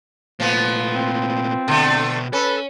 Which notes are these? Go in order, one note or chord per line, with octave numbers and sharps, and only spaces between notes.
A#2 F3 A3 B3
C4
B2 D3 A3 G5
C#4 A4 B4